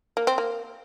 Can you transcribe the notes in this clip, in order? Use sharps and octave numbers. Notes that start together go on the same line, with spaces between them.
A#3
C4
A#3